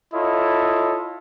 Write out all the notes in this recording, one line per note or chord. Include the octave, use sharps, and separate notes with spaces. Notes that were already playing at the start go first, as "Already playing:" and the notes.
E4 F4 A4 C#5 D#5